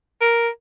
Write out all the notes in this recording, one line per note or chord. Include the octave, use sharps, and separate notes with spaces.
A#4